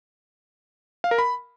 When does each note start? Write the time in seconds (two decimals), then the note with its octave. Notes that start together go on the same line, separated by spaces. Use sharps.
1.04 F5
1.11 A#4
1.18 B5